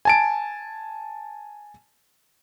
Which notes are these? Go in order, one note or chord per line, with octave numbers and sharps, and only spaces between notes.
G#5 A5 D7